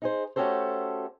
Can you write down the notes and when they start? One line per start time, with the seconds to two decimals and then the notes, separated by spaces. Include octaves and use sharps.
0.02 D#4 G#4 C5
0.36 A3 C#4 F#4 G4 A4 C5